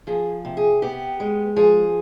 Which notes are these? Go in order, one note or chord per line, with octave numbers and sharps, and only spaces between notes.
F3 G#4
C3
G#4
B3 G4
G#3
F3 G#4